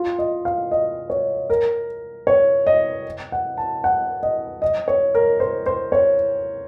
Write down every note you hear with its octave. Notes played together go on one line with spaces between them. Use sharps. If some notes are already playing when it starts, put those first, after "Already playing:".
Already playing: F4
D#5
F5
D#5
C#5
A#4
C#5
D#5
F#5
A5
F#5
D#5
D#5
C#5
A#4
C5
C5
C#5